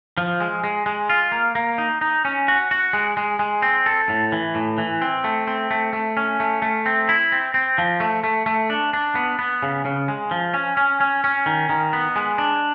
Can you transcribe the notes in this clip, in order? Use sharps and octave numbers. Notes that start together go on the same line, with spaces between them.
F3
G#3
G#3
G#3
F4
A#3
A#3
D#4
D#4
C#4
F#4
F#4
G#3
G#3
G#3
C4
A4
A2
E3
A2
E3
C4
A3
C4
A3
A3
C#4
A3
A3
C4
E4
C4
C4
F3
A3
A3
A3
D4
D4
B3
B3
C#3
C#3
G#3
F3
C#4
C#4
C#4
C#4
D#3
D#3
B3
G#3
D4